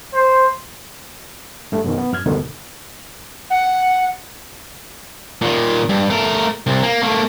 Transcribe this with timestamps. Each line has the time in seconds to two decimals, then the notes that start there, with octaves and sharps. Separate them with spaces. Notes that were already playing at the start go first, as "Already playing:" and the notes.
0.14 C5
1.72 G2 A3
1.84 F#2 B2 D#3
1.98 B3
2.12 F#2 F6 G#6
2.26 D2 G2 B2 D3 D#3
3.50 F#5
5.42 A#2 D#3
5.89 G2
6.10 A3 A#4
6.67 C2
6.83 A#3
7.03 A3 A#3